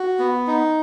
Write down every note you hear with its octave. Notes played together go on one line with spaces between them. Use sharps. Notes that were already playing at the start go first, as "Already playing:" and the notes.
Already playing: F#4
B3
D#4